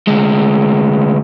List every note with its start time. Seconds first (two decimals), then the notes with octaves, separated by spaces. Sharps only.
0.07 D2 G#3